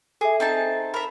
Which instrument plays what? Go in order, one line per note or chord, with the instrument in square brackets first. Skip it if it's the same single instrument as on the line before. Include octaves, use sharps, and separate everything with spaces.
[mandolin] G#4 [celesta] A4 E5
[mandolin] C4 D#4 A5
[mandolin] A#4 E5 [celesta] B5